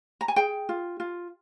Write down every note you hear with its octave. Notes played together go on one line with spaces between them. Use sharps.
A#5
G#5
G#4 G5
F4
F4